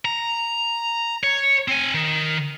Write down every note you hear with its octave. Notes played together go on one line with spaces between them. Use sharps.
A#5
C#5
C4 G#5
D#3